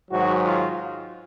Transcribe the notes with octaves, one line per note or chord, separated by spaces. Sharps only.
G#2 D#3 F#3 F#4
F4